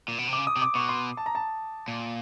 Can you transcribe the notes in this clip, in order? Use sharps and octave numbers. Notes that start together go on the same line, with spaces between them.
A#2
B2
C3 D6
C#3
D#6
C3
D6
B2 C#6
C6
A5
A#5
A5
A#2